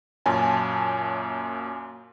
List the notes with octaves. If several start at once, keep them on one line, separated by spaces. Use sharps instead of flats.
F#2 A#2 C#4 G#5 A5